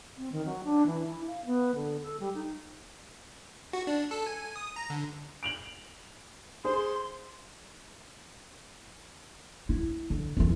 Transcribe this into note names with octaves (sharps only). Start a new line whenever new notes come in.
C4
D#3
F#3
D4
E3
E4
F5
B3
D3
A4
G3
D#4
F#4
D4
A4
G#5
D#6
A#5
D3
D7 F7 F#7
G#4 C5 C6
E4
D3
F2 E3